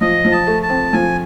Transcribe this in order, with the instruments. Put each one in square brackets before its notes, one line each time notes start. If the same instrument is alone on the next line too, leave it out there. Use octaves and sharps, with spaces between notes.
[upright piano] F3 [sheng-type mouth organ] D#5
[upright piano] F3
[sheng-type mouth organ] A5
[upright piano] A3
[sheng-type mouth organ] A5
[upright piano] C4
[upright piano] F3 [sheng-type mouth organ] G#5